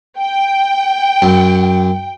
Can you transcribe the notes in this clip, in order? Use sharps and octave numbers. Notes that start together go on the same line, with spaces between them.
G5
F#2